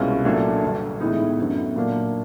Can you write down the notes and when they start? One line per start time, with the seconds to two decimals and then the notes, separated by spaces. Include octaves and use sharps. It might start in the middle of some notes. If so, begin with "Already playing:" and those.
Already playing: C2 B2 G#3 C#4 F4
0.25 A#1 A#2 F#3 A3 D4
0.63 G1 G2 D3
1.00 A2 E3 G#3 B3 D#4
1.38 F#2 D3 F#3 B3
1.76 A#2 F#3 A#3 D4 F4